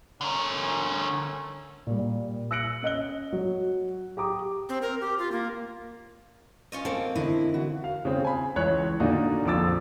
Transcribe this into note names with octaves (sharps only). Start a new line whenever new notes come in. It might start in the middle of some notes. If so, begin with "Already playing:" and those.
D3 A3 C#4 A#4
A#2 G3
E6 F#6 A#6 C#7 D7 F#7
C#4 D#5 F#6 G7
F#3 F#4
G4 A#5 D6 D#6
C4
A#4
G4
F4
A#3
C#4 F4 D#5
A#3 C4 A4
D3 E4 D#5
E4 F#4
F5
C#3 C4
G#5 B5
C#2 E3 C#5 F#6
A#2 D3 A#3 D4 D#4 F#4
A#1 F2 F3 D6 E6 A6